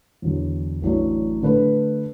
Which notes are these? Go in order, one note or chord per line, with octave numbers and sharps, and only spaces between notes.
E2 D3 F#3
A1 A2 F#3 D4
D3 A3 D4 B4